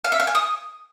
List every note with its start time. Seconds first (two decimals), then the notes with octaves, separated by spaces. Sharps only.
0.04 F5
0.12 E5
0.20 F5
0.27 G#5
0.35 D#6